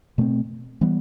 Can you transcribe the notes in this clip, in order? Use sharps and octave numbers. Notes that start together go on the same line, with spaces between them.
B2 A3 C4
E3 G3 B3